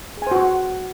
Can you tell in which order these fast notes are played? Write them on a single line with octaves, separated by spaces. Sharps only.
G#4 G#5 C5 F#4